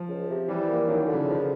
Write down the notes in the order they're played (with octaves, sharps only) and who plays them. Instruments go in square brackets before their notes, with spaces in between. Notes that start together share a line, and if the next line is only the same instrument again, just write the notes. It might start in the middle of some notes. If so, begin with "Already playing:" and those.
Already playing: [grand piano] F3
[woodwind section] C#2
C3
[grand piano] E3 [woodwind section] G3
[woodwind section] A#3
[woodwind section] F#2 [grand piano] D#3
[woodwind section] D3
[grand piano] C#3
[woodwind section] F3